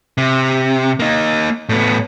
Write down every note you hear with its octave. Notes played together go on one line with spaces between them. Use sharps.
C3
A#3 D#4
A2 B3